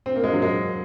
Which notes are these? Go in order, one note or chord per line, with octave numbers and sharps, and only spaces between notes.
C4
A#3
G#3
F#3
G#3